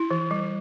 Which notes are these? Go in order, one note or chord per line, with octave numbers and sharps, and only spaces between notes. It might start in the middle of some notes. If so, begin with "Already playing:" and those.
Already playing: E4
E3
G3